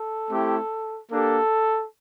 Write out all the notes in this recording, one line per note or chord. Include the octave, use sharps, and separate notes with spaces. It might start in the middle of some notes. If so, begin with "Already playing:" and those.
Already playing: A4
A3 C4 E4 G4
A#3 D4 G4 A4